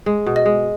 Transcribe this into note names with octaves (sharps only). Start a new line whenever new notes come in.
G#3
B2
D#5
G#3